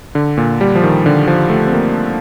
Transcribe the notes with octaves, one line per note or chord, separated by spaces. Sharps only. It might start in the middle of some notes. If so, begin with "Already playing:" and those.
D3
A#2
G3
F3
D#3
D3
F3
A3
C4
A#3